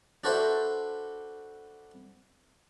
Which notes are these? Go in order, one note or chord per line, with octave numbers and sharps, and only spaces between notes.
D4 F#4 A4 B4 C5 E5